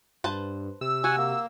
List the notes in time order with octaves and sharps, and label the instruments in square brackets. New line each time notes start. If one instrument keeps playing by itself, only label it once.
[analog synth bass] G2 [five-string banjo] B4 C5 A5
[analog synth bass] C3 [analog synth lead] E6
[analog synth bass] C3 [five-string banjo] F#4 [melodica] F#5 G#5
[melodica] A#3